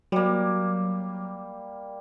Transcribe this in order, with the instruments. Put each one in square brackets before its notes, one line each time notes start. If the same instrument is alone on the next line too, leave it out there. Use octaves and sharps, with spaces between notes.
[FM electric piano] F#3 [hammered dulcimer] G3 A#3